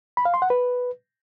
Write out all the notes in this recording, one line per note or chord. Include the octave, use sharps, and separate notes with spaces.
B5
F5
C6
F#5
B4